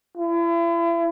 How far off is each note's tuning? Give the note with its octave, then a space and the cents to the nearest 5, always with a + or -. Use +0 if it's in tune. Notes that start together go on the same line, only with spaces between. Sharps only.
E4 +40